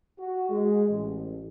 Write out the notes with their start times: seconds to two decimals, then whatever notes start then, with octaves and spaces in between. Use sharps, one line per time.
0.18 F#4
0.50 G#3
0.89 A1